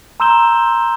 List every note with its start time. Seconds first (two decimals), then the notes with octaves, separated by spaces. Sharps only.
0.20 A#5 C6 E6 G6 E7 G7